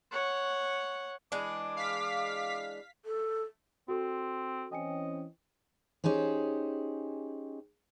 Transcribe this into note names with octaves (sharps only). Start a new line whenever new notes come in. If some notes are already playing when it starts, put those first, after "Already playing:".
C#5 F#5
E3 G#3 D4 D6
F5 B6
A4
C4 F#4 A4 C6
E3 C4 C#4 D#5 G5 G#5 C#7
C#4 D#4 G4 G#4 C5